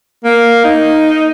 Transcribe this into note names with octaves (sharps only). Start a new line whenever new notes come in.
A#3
D#4